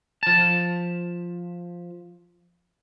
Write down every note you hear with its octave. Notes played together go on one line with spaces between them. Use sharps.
F3 A5